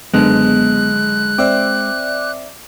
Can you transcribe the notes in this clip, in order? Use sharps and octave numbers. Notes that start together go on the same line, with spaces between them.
F#1 D3 G#3 B3 F#6
C4 D5 E5 D6